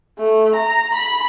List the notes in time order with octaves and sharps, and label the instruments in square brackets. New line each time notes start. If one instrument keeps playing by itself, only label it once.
[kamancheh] A3
A#5
B5